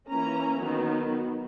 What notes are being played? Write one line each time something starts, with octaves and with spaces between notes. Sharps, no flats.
E3 A#3 C#4 A#5
D#3 F#3 B3